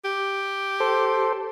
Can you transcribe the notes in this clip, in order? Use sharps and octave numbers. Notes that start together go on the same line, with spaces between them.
G4
A4 C5